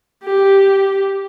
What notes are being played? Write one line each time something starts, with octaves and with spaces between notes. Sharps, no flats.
G4